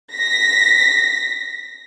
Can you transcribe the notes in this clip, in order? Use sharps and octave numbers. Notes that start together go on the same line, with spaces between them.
A#6 B6